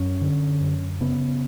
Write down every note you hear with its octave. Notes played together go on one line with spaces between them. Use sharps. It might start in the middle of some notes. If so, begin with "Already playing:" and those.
Already playing: F#2 C#4
D3
F#2
C#3 B3